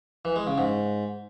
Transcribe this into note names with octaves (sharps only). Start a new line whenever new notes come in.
E3
G#3
C#3
G#2